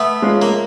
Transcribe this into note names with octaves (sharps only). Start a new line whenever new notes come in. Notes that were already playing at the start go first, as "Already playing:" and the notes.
Already playing: A3 B3
G#3 C#4 F4
A#3